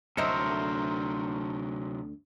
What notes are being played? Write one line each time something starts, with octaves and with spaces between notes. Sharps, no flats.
D2 C3 F#3 E4 A4 A#4 C5 D#5